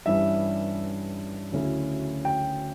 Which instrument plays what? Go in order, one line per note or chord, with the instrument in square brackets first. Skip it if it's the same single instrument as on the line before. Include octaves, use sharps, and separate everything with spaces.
[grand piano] G2 E3 G3 C#4 E4 E5
D2 C#3 F#3 C#4 E4
G5